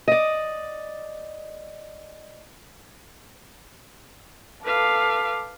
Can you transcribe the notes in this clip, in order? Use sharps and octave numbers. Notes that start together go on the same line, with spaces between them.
D5 D#5
A4 B4 F5 D6